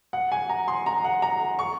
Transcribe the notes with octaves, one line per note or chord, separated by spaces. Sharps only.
F#5
G#5
A#5
C6
A#5
F#5
A#5
C#6